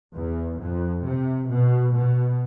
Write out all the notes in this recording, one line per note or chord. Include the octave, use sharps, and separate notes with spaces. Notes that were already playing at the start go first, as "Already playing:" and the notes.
E2
F2
C3
B2
B2